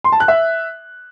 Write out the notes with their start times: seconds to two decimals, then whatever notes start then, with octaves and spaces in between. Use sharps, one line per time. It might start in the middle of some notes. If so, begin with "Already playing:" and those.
0.04 C6
0.12 A5
0.20 F#6
0.28 E5